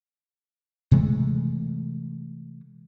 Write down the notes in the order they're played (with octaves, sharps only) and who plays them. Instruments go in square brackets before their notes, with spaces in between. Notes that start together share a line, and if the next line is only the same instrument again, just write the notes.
[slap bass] C3 E3 G#3 A3